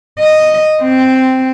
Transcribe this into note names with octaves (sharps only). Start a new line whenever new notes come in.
D#5
C4